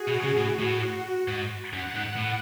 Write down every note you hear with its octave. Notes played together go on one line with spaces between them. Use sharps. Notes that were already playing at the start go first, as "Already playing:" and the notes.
Already playing: F#4 G#4
B2
C#3
A2
A2
G#2
F#2 F#5
G#2
A2